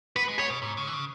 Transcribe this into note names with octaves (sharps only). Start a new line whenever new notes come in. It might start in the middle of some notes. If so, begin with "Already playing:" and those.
B3 B4
G#3
B3 C#5
B2
G#2
C#3
E3
C#3